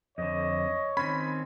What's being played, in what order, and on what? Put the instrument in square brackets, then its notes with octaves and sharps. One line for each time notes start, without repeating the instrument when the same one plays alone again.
[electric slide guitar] F2 D3 [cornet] C#5 [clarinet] D#5
[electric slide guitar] D#3 C4 C#4 [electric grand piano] B5